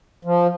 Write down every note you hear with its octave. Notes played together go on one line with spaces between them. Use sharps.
F3